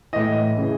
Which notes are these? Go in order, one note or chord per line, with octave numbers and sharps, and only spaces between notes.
A2 E3 D#5
C#3 E3